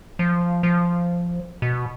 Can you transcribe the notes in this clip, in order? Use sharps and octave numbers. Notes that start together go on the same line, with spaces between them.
F3
F3
B2